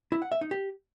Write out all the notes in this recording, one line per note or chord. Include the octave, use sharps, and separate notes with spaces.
E4
F#5
E5
D#4
G4